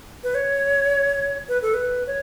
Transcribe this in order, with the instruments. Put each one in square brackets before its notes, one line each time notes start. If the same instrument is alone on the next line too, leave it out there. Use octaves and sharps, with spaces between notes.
[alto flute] B4
C#5
B4
A4
B4
C#5